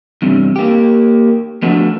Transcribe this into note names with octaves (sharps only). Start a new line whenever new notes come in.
E2 G2 C3
A#3 G4
F3 A3 B3 D4 F#4